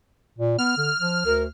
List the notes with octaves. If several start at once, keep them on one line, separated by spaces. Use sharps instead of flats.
A#2
B3 F6
D3
F3
D2 A#4